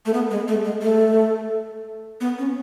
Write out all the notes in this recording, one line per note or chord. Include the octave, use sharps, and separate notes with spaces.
A3
B3
G#3
A3
G#3
A3
B3
C#4